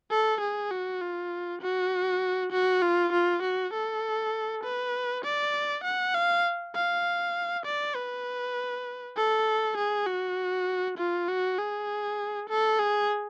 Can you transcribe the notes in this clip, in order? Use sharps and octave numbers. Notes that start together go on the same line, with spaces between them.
A4
G#4
F#4
F4
F#4
F#4
F4
F4
F#4
A4
B4
D5
F#5
F5
F5
D5
B4
A4
G#4
F#4
F4
F#4
G#4
A4
G#4